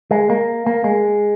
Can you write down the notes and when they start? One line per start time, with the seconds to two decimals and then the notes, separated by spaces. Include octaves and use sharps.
0.11 G#3
0.30 A#3
0.67 A#3
0.84 G#3